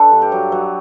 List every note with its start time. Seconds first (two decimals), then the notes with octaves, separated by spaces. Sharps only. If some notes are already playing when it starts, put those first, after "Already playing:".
Already playing: D4 A4 B4
0.12 G2
0.22 G4
0.32 F#3
0.52 F#3